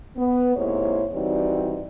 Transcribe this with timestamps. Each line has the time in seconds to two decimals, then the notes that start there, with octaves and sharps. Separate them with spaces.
0.17 B3
0.56 G#2 C3 A#3 E4 C5 C#5
1.12 E3 G3 C4 D#4 F#4 D5